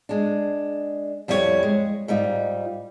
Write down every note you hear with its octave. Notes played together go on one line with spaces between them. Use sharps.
G#3 D4
F2 G3 E4 F4 C#5
G#3
G#2 G3 D#4 F4